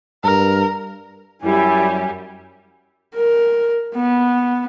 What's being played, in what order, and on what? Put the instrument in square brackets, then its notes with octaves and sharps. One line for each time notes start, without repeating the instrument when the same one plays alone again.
[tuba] G2 [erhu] A#4
[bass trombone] F#2 [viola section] G3 G4 [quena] E4 [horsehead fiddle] G#5
[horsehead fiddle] A#4
B3